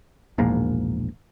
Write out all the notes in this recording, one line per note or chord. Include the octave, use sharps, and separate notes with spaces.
E1 A#1 G#2 A#3